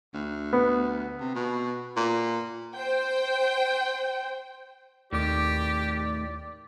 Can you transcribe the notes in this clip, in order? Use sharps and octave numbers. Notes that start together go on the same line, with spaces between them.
D2
B3
C3
B2
A#2
C5 G5
D#2 A2 D#3 G4 D5 D6